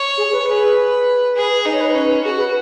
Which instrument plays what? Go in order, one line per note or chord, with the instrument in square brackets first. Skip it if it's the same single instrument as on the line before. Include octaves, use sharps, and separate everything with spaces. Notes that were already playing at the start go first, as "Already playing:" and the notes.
Already playing: [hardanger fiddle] C#5
[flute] G#4
B4
[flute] G#4 [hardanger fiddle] B4
[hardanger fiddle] G#4 [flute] B4
[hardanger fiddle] D#4 [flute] B4
[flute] C#5
B4
[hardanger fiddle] C#4 [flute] B4
[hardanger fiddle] F#4 [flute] G#4
[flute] B4